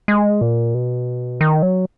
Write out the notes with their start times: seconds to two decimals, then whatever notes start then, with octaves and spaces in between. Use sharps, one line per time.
0.08 G#3
0.41 A#2
0.74 B2
1.41 D#3
1.62 F#3